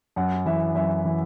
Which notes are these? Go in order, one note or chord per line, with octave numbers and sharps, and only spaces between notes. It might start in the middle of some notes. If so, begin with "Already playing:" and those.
F#2 F#5
E3 E5
F#2 E5
E3